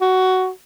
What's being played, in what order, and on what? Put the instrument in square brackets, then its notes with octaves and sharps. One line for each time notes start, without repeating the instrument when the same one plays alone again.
[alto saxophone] F#4